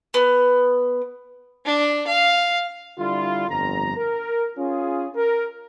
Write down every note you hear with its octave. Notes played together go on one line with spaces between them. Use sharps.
B3
D4
F5
D3 G3 E4 F4
G1 F2 A#5
A#4
C#4 F4 G#4
A#4